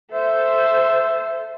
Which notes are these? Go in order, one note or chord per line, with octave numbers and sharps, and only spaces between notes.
A4 C5 E5